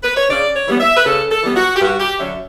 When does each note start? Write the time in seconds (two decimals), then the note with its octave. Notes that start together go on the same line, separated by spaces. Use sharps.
0.03 B4
0.16 C#5
0.29 C#3 D5
0.55 C#5
0.68 E3 G3 B3
0.80 E5
0.96 B4
1.05 C#3 A4
1.31 A4
1.44 E3 G3 B3
1.56 F#4
1.76 G4
1.81 G2 F#4
2.00 G4
2.19 D3 F#3 C#4 E5